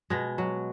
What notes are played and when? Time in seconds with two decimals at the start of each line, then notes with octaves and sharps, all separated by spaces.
0.10 B2 G#3
0.38 F#3